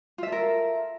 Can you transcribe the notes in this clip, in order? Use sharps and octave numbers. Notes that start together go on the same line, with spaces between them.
F4 A4 A#4 E5